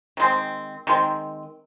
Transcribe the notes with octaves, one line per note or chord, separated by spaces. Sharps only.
D#3 G#3 C4
D#3 G#3 C4